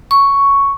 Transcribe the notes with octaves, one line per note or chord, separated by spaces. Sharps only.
C#6